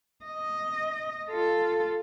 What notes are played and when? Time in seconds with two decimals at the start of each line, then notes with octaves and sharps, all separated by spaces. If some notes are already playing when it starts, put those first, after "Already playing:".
0.25 D#5
1.30 F4 A4